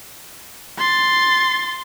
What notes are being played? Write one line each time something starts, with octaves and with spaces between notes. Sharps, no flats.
C6 A6